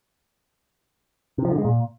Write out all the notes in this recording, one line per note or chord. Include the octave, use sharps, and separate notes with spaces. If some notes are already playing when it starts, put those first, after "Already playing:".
C3
F3
D3
G#3
A#2